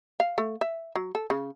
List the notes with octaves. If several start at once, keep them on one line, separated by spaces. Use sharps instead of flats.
F5
A3
E5
F#3
A4
C#3